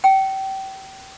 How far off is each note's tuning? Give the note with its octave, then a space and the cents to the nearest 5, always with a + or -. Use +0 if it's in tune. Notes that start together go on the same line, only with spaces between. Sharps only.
G5 -30